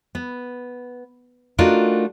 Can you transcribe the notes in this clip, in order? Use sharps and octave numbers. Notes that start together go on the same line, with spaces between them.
B3
A3 D4 D#4 F4 F#4 A#4